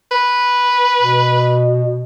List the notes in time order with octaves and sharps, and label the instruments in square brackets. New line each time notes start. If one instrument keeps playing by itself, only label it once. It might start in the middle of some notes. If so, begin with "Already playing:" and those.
[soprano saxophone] B4
[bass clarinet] B2